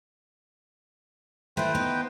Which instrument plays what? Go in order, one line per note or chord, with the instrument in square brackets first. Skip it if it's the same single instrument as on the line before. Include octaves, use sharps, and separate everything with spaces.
[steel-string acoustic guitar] A3 E4 [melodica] B4 C5 G5
[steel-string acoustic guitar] B3 D#4